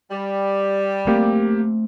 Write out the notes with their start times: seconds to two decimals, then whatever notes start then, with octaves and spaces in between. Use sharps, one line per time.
0.11 G3
1.07 A3 A#3 C4 G4